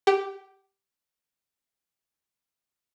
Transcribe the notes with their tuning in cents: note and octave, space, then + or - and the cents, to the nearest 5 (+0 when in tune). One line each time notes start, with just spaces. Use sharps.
G4 +0 G5 -40